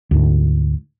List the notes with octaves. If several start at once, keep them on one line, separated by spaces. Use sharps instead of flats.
D2 G#2